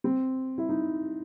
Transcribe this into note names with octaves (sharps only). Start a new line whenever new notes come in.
C4
E4
D#4